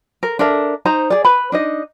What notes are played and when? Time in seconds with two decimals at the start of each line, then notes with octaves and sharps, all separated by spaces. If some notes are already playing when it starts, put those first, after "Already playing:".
0.23 A#4
0.39 D4 A4 A#4 E5
0.85 D#4 C5 A#5
1.10 G#4 D5
1.25 B4 B5
1.52 D4 D#4 D#5